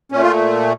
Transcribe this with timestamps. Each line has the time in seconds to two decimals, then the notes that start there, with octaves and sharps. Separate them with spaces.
0.12 A#2 A3 C#4
0.22 F4